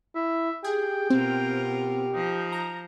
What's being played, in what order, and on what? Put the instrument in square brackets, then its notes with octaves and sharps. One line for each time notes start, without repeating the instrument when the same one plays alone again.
[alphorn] E4 [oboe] E5
[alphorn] G4 [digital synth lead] G#4 [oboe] G5
[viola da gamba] B2 F4 A#4 [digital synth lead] C4
[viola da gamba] F3 [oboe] D#4
[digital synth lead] A#5